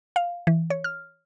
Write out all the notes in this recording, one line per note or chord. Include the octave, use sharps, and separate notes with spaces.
F5
E3
C#5
F6